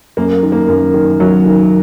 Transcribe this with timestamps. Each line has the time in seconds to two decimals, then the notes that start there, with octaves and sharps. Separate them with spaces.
0.17 F#2 A#3
0.43 D#3
0.52 A#3
0.68 F#2
0.94 D#3
1.20 F#2 F#3
1.46 D#3